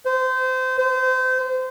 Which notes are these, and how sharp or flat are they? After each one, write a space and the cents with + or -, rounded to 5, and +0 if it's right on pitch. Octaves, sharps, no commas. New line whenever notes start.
C5 -25
C5 -30